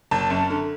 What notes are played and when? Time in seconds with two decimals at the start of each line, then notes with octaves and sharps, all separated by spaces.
0.11 F#1 A5
0.30 F#2
0.50 D3